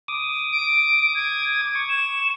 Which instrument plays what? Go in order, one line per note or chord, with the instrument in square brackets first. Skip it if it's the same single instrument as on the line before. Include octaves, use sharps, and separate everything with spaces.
[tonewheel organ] D6 D#6
[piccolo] D7
G#6
[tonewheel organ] C#6
[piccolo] E7